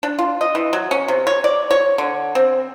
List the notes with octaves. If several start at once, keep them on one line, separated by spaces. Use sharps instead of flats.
D4
F4
D#5
E3
F#3
C#4
C3
C#5
D5
C#5
D3
C4